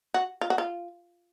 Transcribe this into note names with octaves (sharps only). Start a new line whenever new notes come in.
F#4
F4
F#4
F4